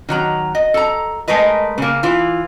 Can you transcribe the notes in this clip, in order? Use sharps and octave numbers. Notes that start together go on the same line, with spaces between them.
D#3 F#3 A#5
D#5
A4 A#5
G#3 A3 A#4 B4 D#5
C#3 A#3
E3 F4